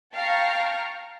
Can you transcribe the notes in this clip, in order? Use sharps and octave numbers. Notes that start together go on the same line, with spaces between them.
F5 G5 A5 A#5 C#6 F6